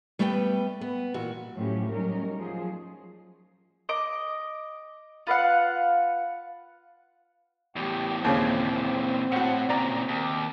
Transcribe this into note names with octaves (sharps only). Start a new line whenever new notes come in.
G3 A3 B3 B4 F5 G5
B3
A#2 E3 F#4
A2 F3 F#3 C#4 G4
F#3 G3 A3 C#4 D#4 A#4
F3 F#3 G#4
D#5 D6
F4 B4 F5 F#5
E2 A2 G4
D#2 A#2 C#3 E3 C4
A2 F#4 F#5
A#2 C#3 D5 A#5
D#2